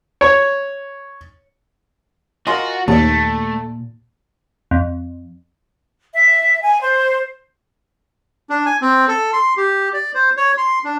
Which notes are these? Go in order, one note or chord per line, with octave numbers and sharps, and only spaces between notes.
C#5
F4 F#4 A#4 D#5 G#5 C6
D#2 A#2 A3 D5 A5
F2
E5
G#5
C5
D4
G#5
C4
A4
C6
G4
D5
C5
C#5
C6
D4